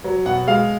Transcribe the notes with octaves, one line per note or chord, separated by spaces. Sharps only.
F#3
B2 F#5
G#3 F5